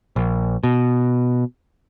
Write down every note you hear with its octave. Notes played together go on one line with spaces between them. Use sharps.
A#1
B2